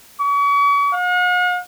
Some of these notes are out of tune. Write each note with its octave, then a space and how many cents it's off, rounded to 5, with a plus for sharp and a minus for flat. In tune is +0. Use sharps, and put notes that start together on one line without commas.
C#6 +40
F#5 -45